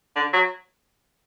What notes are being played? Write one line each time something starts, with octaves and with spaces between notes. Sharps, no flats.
D3
F#3